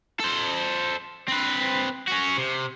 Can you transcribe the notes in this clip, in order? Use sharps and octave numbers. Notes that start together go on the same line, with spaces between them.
A4 C5
C4 B4
C#4 F#4
C3